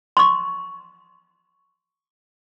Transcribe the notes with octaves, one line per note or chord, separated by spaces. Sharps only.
C6 C#6